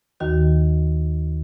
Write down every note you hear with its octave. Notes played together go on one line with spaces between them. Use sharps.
D#2 D#3 F#4